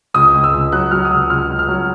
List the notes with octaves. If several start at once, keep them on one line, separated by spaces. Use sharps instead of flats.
C#2 D#6
C#2
E6
C#2
F#3 F#6
F#3 F6
D#6
C#2 E6
C#2 F6
C#2
F6
F#3